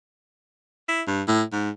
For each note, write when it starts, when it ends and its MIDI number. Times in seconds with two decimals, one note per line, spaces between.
0.89 1.02 64
1.07 1.23 43
1.28 1.43 45
1.53 1.70 44